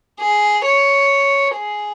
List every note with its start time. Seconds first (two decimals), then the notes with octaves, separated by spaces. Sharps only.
0.20 G#4
0.66 C#5
1.56 G#4